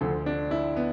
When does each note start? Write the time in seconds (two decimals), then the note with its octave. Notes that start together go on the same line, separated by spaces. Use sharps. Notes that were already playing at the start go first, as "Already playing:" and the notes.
0.01 D2 D3 F3 A4
0.26 D4
0.51 E4
0.76 B3